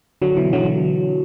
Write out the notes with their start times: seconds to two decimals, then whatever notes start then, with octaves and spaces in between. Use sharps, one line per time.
0.22 D3 F#3
0.37 B2 E3
0.53 D3 F#3